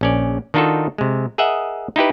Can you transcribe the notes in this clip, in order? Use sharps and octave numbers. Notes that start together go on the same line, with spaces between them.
A#1 C#4 D5
D#3 D4 D#4 F4 F#4 A4
C3 G#3
G#4 A#4 D#5 E5 F#5
D#4 E4 G4 B4